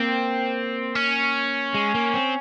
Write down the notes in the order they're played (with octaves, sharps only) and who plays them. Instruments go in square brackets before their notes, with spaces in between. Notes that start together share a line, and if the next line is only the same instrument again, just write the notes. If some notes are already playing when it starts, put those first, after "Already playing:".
Already playing: [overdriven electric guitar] A#3 [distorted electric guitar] C4
[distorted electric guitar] C#4
[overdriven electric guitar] G#3
A#3
C4